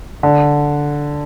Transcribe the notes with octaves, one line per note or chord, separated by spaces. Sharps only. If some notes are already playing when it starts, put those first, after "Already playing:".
D3